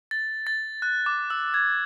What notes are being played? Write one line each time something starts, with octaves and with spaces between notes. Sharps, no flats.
A6
A6
F#6
D6
E6
G#6